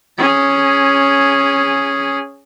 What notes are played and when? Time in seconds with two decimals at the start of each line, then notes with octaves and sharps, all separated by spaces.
0.17 C#4 G#4